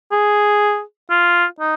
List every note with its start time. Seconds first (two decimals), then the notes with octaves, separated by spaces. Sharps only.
0.12 G#4
1.10 F4
1.60 D#4